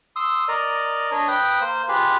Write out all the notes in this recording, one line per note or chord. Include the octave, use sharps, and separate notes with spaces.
C6 D#6 E6
A#4 D5 D#5
D4 C#5 D#5
B4 G5 D#6
A#3 C5
F4 G4 G#4 B4